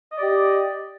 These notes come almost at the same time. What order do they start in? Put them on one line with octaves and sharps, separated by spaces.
D#5 D5 G4